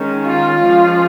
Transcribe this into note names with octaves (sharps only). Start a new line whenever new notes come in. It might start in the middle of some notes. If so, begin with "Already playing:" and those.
Already playing: D#3 G#3 C#4
F4
F3 G#3 C#4